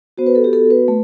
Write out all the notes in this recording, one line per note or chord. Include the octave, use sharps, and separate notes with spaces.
B3 F#4 C5
B4
A4
G4
A4
B4
A3